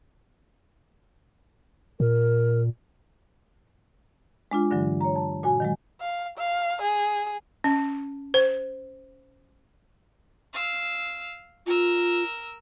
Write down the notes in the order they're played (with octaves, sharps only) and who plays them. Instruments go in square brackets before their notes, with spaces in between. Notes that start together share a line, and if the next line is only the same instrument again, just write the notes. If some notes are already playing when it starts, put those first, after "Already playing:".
[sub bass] A#2 [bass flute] A#4
[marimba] G#3 D4 F4
G2 D3 E3 F#3
C#5 A#5
A5
A#2 F#4 G#5
D#3 F#3 G#3
[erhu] F5
F5
G#4
[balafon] C#4
C5
[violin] F5 E6
[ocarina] F4 [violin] A#4 E6